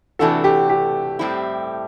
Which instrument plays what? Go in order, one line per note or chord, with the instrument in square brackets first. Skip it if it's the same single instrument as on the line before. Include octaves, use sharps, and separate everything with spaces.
[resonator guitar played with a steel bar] C3 E3 A3 D4 F#4 [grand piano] A4
[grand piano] G4
G4
[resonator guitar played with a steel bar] A2 G3 C4 E4